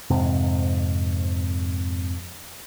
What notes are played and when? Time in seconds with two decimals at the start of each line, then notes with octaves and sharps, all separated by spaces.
0.10 F2 G#2 C3